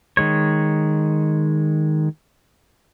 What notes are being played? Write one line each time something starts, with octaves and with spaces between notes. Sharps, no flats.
D#3 G#3 C#5